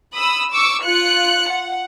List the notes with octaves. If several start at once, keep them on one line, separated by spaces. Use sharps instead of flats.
B5 D#6 E6
C#6 D6 E6
F4 F#6 C#7
F#5